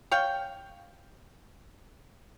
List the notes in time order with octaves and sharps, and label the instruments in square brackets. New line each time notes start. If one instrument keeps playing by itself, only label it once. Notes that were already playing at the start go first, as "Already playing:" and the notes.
[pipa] C#5 F5 G5